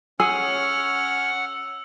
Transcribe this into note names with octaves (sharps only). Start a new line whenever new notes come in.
C#4 G#4 C#5 F#5 G#5 E6 F6